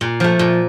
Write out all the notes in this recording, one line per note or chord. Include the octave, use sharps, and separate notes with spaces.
A#2
F3 A3
A#2